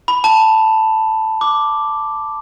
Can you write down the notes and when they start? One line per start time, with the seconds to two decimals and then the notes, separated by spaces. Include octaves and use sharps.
0.08 B5
0.24 A5
1.41 D6